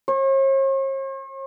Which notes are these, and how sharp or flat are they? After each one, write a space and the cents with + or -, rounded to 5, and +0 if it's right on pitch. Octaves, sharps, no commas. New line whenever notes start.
C#5 -45